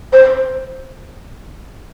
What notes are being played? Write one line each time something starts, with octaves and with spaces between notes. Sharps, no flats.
C5